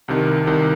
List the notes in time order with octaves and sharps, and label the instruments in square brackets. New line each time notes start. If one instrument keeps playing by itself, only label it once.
[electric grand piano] C2 C3 D#3
C2 C3 D#3